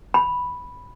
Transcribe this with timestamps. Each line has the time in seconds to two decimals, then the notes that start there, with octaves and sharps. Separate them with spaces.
0.14 B5